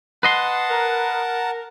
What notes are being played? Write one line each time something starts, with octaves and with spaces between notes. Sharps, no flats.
B4 D#5 F#5 A5 C6
A#4